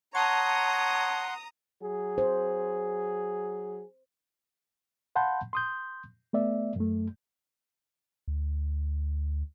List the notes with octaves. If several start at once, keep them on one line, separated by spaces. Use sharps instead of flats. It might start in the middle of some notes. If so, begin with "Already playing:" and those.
C#5 F#5 A5 A#5 C6 D#6
F#3 G#4
C5
F5 F#5 A5 B5 C6 G6
C6 D#6 G6
A3 B3 D5 E5
F#2 A3
D2